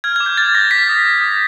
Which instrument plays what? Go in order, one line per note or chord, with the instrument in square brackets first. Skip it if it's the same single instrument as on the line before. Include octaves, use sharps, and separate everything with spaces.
[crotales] F6 G#6
G#6
D6
G6
F6 A6
D6 A#6
G6 B6
D#6
G6
D#6